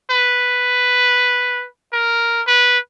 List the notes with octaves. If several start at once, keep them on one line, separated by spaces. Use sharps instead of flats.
B4
A#4
B4